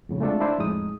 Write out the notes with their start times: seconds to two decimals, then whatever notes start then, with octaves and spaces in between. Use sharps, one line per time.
0.09 F2 A2 C#3
0.20 G#3 A3 C4 D4 F4 A4
0.41 D4 E4 C5
0.58 F2 A2 G#3 D#4 D#6